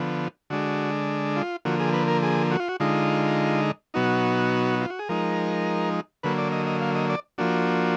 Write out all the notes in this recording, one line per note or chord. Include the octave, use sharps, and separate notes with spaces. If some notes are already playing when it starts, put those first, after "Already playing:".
Already playing: D3 F3 B3
D3 G#3 D4 F#4
F4
D3 F3 A#3 F#4
G#4
B4
A#4
G#4
F#4
F4
F#4
D3 G#3 D#4 F4
B2 F#3 B3 D#4 F#4
F4
F#4
G#4
F3 G#3 D#4 A#4
D3 F#3 A#3 B4
D5
D#5
D#5
F5
D#5
D5
F3 A#3 D4 F#4